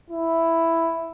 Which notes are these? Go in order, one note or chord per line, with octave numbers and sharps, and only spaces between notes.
E4